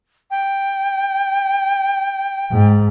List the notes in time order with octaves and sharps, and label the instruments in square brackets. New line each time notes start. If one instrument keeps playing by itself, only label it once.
[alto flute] G5
[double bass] G#2